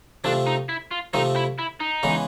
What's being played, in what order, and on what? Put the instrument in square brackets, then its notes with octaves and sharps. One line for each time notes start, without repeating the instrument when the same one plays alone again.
[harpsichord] C3 F3 A3 C4 [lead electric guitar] D4
[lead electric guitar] D#4
E4
F4
[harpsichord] C3 F3 A3 C4 [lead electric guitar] D#4
[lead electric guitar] E4
E4
D#4
[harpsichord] C#3 E3 G#3 B3